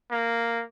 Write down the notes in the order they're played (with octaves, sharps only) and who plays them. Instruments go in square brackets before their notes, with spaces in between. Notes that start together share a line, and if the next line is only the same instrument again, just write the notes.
[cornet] A#3